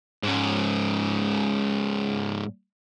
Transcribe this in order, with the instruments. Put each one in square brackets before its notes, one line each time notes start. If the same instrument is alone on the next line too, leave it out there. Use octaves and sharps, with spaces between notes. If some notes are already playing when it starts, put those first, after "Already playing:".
[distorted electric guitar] G#2 C#4